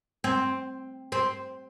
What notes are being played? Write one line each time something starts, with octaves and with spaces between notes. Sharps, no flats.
C4
C4